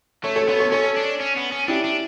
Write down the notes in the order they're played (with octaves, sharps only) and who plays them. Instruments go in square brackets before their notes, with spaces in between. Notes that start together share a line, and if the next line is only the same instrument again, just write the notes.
[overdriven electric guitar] A3 [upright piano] A4 C#5
[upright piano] A4 C#5
[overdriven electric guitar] B3 [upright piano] A4 C#5
[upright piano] A4 C#5
[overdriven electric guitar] C#4 [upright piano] A4 C#5
[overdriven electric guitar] D4
C#4
B3
C#4
[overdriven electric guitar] D4 [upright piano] E4 G4
[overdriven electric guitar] D4